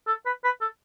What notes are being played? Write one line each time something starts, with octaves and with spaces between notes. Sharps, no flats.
A4
B4
B4
A4